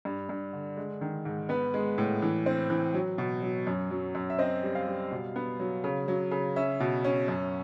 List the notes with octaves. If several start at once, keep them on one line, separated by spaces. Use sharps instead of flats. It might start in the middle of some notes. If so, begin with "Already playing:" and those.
G2
G2
D3
G#3
D#3
G#2
B3 B4
G#3
A2
E3
C4
E3
F#3
B2
F#3
F#2
F#3
F#2
E5
C4 D#5
G3
F5
G3
B2
B3
F#3
C#3
F#3
C#3
C#4 E5
B2
C#4
F#2